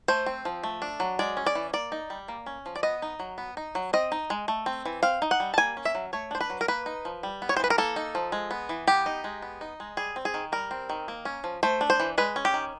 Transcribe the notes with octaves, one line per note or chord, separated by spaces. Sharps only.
A3 C5
C4
F3
A3
D4
F#3
G#3 D5
C#4
D5
E3
A#3 D5
D#4
G3
A#3
C#4
F3
D5
B3 D#5
D#4
F#3
B3
D#4
F#3
C4 D#5
D#4
G#3
A3
C4
E3
C4 F5
D#4
F#5
G3
A5
A#3 G#5
C#4
E5
F#3
A3 C#5
D4 C5
B4
F#3
A#4
A#3 B4
D#4
F3
G3
B3
C#5
C5
E3 B4
A#4
A#3 A4
D#4
F3
G#3
B3
E3
B3 G4
D#4
G#3
B3
D#4
G#3
G3 G#4
C4
G#4
D#3
G3 A#4
C4
D#3
A#3
C#4
F3
A3 C5
D4
C5
E3
G#3 B4
C#4
G4
D#3